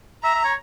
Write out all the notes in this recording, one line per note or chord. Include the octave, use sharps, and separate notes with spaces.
E5 A#5
E5
C#5